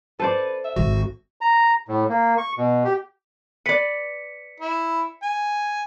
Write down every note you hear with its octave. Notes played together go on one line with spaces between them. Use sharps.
A4 B4 C5 D5
E5
G#1 F#4
A#5
A2
A#3
C#6
B2
G4
B4 D5 B6 C#7
E4
G#5